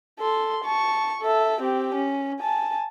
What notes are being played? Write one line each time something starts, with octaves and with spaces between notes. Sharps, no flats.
A4 C6
A5 C#6
A4 E5
C4 G4
C#4
G#5 A5